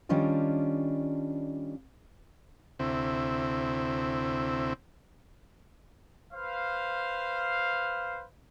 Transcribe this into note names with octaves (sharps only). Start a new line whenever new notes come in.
D#3 G3 C#4 D4 F4 D#5
D2 C3 C4 E4
B4 C5 F5